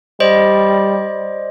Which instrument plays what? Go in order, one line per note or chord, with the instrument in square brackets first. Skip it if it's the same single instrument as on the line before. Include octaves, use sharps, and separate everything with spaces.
[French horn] G3 [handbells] C5 D5 D#5